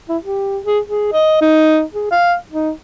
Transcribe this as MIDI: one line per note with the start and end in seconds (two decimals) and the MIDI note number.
0.09 0.17 64
0.23 0.59 67
0.64 0.80 68
0.86 1.11 68
1.12 1.37 75
1.41 1.83 63
1.94 2.07 68
2.11 2.35 77
2.51 2.71 63